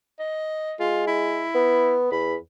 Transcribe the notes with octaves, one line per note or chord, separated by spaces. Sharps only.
D#5
G#3 F4
E4
B3
E2 B5